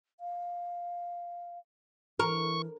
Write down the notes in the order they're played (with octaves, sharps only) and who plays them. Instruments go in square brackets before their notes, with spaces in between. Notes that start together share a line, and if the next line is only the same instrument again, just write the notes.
[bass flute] F5
[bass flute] E3 [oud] A#4 [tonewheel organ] C#6